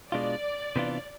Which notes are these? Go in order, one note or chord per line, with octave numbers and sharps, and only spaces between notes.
B2 G#3 D4 F4 D5
C3 E3 B3 D4 F4